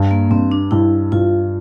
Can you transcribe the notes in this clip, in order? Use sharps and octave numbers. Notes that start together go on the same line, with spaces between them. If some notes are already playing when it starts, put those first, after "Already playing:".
Already playing: G2
A#3
G2 C4
D4
G2 E4
G2 F4